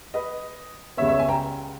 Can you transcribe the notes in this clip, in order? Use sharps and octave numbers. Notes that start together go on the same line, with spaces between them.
B4 D#5
C#2 C#3 G3 B3 C#5 E5
C#5 E5
E5 G#5
G5 A#5